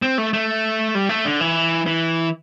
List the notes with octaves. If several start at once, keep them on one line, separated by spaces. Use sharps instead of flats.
C4
A3
A3
G3
A3
D3
E3
E3